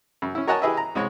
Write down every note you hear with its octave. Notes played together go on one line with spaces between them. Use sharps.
F#2
C#4 E4
A#4 C#5 D#5 F#5 G#5 A5
E4 G4 G#4 B4 D#5 E5
A#5
C2 G#3 C#5 C#6